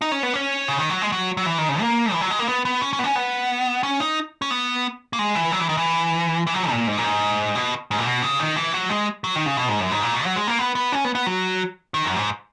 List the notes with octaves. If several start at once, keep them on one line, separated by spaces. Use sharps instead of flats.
D#4
C#4
B3
C#4
C#3
D#3
F#3
G#3
F#3
F#3
E3
D#3
C#3
A#3
E3
F#3
G#3
A#3
B3
B3
C#4
C#4
B3
C#4
B3
C#4
D#4
C#4
B3
A#3
G#3
E3
F#3
E3
D#3
E3
E3
F#3
A#2
G#2
A#2
G#2
B2
G#2
A#2
B2
C#3
D#3
E3
F#3
G#3
F#3
D#3
C#3
B2
G#2
F#2
G#2
A#2
B2
F#3
G#3
A#3
B3
B3
C#4
B3
B3
F#3
D#3
F#2
G#2